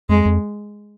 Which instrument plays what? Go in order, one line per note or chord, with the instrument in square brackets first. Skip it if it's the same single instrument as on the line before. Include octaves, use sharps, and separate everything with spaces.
[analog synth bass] F2 [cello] G#3
[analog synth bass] F2